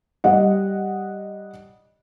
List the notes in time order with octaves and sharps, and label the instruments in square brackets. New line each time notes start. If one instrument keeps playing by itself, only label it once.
[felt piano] G3 D#5 F#5